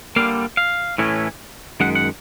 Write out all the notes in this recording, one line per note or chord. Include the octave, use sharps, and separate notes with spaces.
D3 G3 A#3 F5
F5
A2 E3 A3 C#4
F#2 D#3 G#3 F#5
F#5